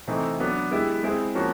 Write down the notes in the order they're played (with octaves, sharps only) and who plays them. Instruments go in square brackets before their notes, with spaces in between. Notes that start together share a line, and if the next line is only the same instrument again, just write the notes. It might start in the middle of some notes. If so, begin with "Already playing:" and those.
[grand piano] C3 E3 A3 C4 D#4
F#3 B3 D4
G#3 B3 E4 G4
G#3 C4 E4 G#4
F3 A#3 C#4 F#4